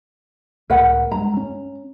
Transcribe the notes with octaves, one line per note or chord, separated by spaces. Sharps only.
C#2 A2 A#4 B4 F#5
G2 G#3 A#5
C#4